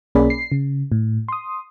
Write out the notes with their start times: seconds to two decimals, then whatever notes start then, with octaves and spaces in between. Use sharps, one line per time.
0.15 B1 A#3 C#4 G#4 D5 B5
0.30 C7
0.52 C#3
0.92 A2
1.28 C6 D#6